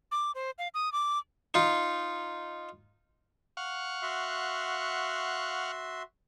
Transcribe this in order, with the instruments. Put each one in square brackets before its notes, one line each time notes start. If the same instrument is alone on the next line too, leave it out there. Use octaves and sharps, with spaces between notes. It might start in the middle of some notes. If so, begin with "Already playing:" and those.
[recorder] D6
C5
F5
D#6
D6
[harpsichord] D#4 F4
[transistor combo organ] F5 F#5 C#6
[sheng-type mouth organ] F#4 E5 C6